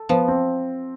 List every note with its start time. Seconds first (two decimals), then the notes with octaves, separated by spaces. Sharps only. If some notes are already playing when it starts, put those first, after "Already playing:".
Already playing: A4
0.09 F3 B3
0.28 C4